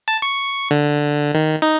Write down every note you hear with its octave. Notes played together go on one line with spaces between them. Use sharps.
A5
C#6
D3
D#3
D#4